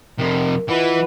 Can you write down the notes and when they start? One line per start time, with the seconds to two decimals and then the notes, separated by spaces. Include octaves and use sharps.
0.18 F2 C3 A#4
0.68 E3 F4 B4 D#5 F#5